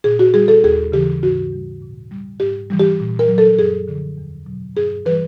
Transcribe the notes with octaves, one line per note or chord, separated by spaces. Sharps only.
A#2 G#4
F#4
G3 G#4
A4
D#2 G#4
C#3 E3 G4
G#2 F#4
E3 G3
A#2
G3
G#2 G4
E3 G3
G4
A#2
A#4
F#3
A4
F#2 G#4
D3 F3
E2
B2 F#3
G2 G#4
E3 G3 B4